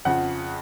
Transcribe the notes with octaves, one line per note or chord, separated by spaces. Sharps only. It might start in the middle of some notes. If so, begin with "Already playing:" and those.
F2 C#3 F3 F#5